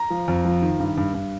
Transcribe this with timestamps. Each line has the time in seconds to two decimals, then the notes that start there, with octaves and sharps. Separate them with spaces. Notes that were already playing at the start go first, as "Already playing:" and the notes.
Already playing: A#5
0.10 F3
0.28 F2
0.45 F3
0.62 D#3
0.79 G2
0.97 G2
1.14 G2